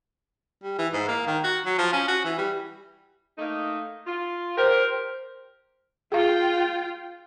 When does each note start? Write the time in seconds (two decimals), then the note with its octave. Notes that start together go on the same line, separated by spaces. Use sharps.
0.63 G3
0.79 E3
0.93 G#2
1.08 A#3
1.27 D#3
1.44 F#4
1.65 F#3
1.78 F3
1.93 C#4
2.08 F#4
2.25 E3
2.38 G3
3.38 A3 A#3 D#4
4.07 F4
4.57 G4 A#4 C5
6.12 F4 G#4 F5 G5